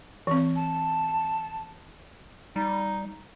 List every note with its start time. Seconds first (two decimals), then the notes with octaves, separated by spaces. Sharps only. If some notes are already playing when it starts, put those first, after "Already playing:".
0.27 E3 C4
0.56 A5
2.56 G3 D#4